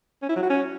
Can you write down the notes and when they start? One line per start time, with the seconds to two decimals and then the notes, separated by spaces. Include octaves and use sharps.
0.22 C#4
0.29 E4
0.36 F#3
0.43 F#4
0.50 C#4